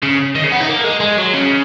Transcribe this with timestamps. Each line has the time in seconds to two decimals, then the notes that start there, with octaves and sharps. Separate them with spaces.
0.03 C#3
0.35 D#3
0.44 C#3
0.52 B3
0.60 D#4
0.68 A#3
0.84 G#3
1.00 G#3
1.18 F#3
1.34 C#3